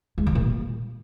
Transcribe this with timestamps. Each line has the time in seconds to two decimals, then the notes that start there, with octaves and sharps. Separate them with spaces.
0.18 G#3
0.26 D#3
0.35 A#2